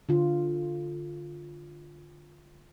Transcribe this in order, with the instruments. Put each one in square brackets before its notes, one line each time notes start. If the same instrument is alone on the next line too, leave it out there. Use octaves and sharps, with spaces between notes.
[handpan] D3 F4